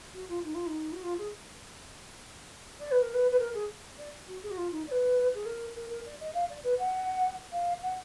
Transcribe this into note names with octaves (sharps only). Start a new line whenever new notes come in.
F#4
F4
D#4
F4
D#4
F#4
F4
G#4
D5
B4
A#4
B4
B4
A#4
G#4
D5
F#4
G#4
F#4
F4
D#4
D5
B4
G#4
A#4
A#4
A#4
D5
D#5
F5
D5
B4
F#5
F5
F#5